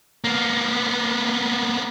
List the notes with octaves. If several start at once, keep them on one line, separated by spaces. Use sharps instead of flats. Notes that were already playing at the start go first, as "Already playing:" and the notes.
A#3 B3